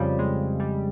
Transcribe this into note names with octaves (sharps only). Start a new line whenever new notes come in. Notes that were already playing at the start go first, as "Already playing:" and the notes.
Already playing: F2 C#3 F3 G3
G#3
G3